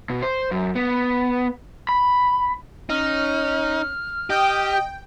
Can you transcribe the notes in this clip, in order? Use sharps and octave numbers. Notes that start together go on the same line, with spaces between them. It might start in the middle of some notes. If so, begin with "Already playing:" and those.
B2
C5
F#2
B3
B5
C#4 D#4 F6
G4 D#5 G5